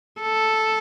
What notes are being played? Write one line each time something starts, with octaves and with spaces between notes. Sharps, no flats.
A4